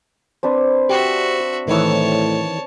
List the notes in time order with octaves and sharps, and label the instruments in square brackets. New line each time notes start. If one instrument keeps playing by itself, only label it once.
[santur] C4 D4 B4
[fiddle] F#4 E5 [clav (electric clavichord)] G4
[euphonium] A2 [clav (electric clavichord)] D#3 E3 [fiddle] C#5 A5